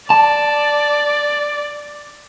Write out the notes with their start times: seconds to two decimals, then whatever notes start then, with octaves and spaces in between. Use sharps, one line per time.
0.10 D5 A5